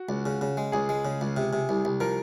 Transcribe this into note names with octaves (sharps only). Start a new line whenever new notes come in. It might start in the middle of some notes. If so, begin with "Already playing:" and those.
Already playing: F#4
C#2
C#3
C#3
G#3
C#2 G#4
G#3
C#3
C#2
C3
C3
C2
C2
F3 A#4